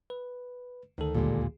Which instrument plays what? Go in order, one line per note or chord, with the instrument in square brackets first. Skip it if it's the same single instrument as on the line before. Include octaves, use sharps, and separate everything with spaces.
[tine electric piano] B4
[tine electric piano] D2 A4 [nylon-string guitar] D#3
[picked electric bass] A1 D#2 D3 [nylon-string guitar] A#2 G3 G#3